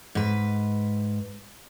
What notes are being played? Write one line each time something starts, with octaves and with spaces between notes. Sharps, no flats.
G#2 B4